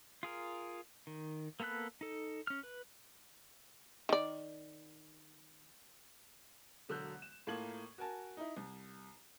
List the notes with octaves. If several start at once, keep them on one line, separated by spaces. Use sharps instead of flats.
F4 G#4 A#4
D#3
A#3 B3 A4 B5 F#6
D#4 A4
C#4 F6
B4
D#3 D5
E1 D3 F#3 E6 F#6 G6
E7
A2 A#3 F4 A5 G#6 F#7
F#4 A#4 G#5 A5
D#4 E4
C2